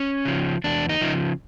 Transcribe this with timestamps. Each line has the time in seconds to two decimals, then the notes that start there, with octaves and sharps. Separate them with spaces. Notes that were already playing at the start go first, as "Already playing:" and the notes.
Already playing: C#4
0.25 C#3 F3
0.64 E2 D4
0.89 D#4
1.01 C#3 F3